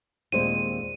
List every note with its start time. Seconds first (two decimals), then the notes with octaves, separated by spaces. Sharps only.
0.32 D#2 A#2 G#3 C4 C5 D#7